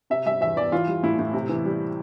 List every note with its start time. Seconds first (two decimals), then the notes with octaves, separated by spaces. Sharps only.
0.10 C3 E5
0.26 G3 E5
0.41 E2 E5
0.56 E2 D5
0.72 E3 F4
0.88 G3
1.03 A2 E4
1.19 A2
1.34 C3
1.49 E3
1.65 G3